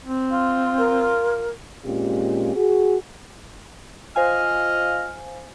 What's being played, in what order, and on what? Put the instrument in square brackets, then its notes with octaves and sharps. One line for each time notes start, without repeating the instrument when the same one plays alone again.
[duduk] C4
[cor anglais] F4
[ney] A#4
[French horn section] A#2 G#3 C4 C#4 F4 G4
F#4 G#4
[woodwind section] F4 D#5 F6 [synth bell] C5 F5 G#5